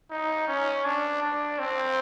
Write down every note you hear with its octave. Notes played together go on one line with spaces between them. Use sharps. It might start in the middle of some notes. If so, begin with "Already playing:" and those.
D#4
C#4
D4
D4
C4